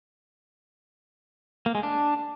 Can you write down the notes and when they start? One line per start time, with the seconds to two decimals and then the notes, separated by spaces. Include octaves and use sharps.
1.66 A#3
1.75 G#3
1.83 D4